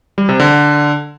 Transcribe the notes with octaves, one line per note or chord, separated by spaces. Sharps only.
G3
C3
D3